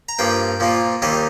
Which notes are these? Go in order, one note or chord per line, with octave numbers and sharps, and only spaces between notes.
A#5
G2 F3 A#3 G5
A#2 F3 A#3
D#2 D#3 G3 A#3 D#5